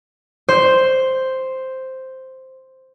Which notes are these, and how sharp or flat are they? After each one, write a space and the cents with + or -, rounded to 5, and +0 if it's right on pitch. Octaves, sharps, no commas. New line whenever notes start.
C5 +0